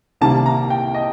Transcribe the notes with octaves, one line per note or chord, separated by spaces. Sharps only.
C2 C3 D#3 G3 A#3 A5
A#5
G5
D#5